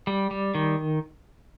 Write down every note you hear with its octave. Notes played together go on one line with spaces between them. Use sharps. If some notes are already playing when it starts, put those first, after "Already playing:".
G3
G3
D#3